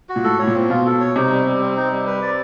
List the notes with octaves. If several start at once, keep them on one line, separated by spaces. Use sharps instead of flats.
F#4
A#2
A2 A4
A2 C#5
A#2
C4
B2 F4
A4
C#5
C3 D#4
G3
G3
C4
D#4
G3
B4
D5